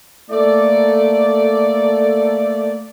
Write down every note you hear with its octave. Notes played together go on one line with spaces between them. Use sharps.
A3 A#3 A4 D5